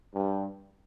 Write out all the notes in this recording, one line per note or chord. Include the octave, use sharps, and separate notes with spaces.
G2